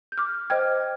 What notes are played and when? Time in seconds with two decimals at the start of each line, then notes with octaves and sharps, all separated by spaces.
0.12 G6
0.18 D6 F6
0.50 C5 D#5 G5 F6 G#6